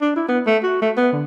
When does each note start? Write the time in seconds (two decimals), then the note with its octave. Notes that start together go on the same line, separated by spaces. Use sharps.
0.01 D4
0.16 E4
0.29 B3
0.47 A3
0.63 F#4
0.82 A3
0.97 B3
1.13 D3